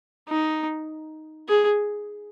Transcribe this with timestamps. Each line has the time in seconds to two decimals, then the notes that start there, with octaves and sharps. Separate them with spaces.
0.29 D#4
1.49 G#4